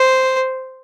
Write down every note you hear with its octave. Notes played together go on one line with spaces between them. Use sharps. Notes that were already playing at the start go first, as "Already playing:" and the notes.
Already playing: C5